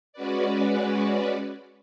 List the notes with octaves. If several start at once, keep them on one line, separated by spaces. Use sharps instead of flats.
G#3 C#4 F#4 B4 D5